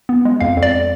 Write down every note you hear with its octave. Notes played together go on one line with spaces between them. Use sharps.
B3
G#3
F2 F5
F2
D5